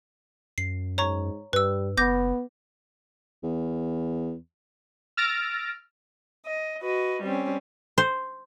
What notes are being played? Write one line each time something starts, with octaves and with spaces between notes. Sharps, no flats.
F#2 C7
G#2 C#5 A#5 C#6
G2 G3 B4 E6
F#1 B3 D6 G6 A#6
E2
E6 F6 A6 A#6 D7
D#5
F#4 B4 D#5
G3 C4 C#4
C5